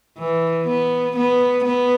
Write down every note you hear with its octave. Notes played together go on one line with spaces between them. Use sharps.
E3
B3
B3
B3